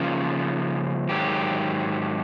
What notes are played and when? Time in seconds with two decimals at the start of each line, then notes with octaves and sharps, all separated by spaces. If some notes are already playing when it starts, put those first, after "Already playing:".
Already playing: C#3 F3 A#3 C#4 F4
1.09 G#2 D#3 F#3 G4